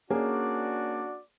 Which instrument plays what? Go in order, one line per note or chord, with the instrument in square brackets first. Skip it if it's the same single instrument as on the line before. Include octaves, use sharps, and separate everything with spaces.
[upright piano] A#3 C#4 G#4 [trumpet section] D4 F#4 D5